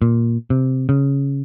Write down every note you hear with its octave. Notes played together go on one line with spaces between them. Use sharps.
A#2
C3
C#3